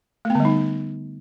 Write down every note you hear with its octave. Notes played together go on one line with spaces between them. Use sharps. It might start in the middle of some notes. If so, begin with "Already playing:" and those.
A3
B3
D3
G3
D#4